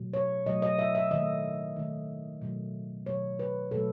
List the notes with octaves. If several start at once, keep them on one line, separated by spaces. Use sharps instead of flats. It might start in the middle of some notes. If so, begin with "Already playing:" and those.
Already playing: B2 F#3 A3
C#5
B2 F#3 A3 D#5
D#5
E5
E5
D#3 A3 D#5
D#3 A3
B2 F#3 A3
B2 F#3 A3 C#5
B4
B2 F#3 A3 A4